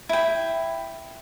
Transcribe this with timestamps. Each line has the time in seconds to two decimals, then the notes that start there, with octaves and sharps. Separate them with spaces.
0.09 E4 G5